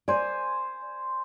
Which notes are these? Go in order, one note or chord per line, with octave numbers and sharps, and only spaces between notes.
C5 D5 G#5